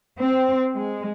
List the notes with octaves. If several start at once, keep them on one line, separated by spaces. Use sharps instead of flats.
C4
G#3